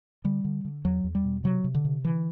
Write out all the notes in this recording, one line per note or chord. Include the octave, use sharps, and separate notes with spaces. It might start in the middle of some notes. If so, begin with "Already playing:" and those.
D3 G3
D3
D3
E2 F#3
E2
G3
B2
C3 F#3
C3
D3
C3
D3 E3